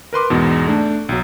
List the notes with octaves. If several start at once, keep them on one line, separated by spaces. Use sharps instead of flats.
A#4 B4 C6 D6
E2 G#2 B2
A3 D4
B1 F#3